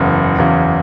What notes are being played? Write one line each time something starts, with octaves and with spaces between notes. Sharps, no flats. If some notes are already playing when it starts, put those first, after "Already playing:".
Already playing: F#1 E2 C#3
F#1 E2 C#3